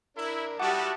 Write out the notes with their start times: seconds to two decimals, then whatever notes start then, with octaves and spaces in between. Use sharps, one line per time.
0.17 D4 E4 A#4
0.60 G3 E4 F#4 G4 F#5 A5 D6 D#6